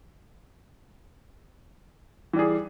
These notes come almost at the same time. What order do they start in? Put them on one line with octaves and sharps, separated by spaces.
E3 G3 G#4